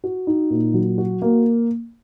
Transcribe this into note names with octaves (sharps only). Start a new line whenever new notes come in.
F#4
D#4
A#2
F#3
F#4
A#3